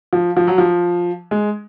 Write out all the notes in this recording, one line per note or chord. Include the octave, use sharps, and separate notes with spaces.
F3
F3
F#3
F3
G#3